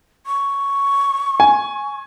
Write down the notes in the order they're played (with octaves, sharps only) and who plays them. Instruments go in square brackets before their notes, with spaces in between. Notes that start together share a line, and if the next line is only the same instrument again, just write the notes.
[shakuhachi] C#6
[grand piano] G#5